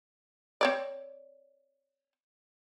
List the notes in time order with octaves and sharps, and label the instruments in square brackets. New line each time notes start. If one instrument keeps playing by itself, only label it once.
[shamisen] C4 C#5 D5